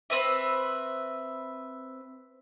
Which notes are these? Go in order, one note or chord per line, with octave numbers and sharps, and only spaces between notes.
C4 B4 E5